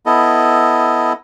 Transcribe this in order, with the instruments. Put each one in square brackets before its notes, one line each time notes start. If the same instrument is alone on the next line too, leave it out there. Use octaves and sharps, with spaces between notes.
[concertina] B3 E4 A4 D#5